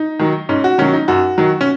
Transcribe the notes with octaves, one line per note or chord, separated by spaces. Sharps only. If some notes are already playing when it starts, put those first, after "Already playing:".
Already playing: D#4
D#3 F#3
G#2 C#4
F#4
D#3 F#3 C#4
D#4
F#2 F#4
D#3 F#3
C#4